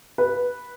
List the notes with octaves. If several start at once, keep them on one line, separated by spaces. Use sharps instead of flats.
B4